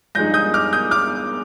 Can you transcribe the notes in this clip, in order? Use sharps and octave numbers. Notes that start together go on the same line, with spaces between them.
G2 F3 G#3 D#4 G6 A#6
D#6 G6
D6 F6
D#6 G6
D6 F6